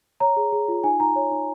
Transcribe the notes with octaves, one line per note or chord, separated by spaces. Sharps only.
C#5 A#5
G#4
G#4
F4
D#4 G#5
D#4 A#5
C#5
D#4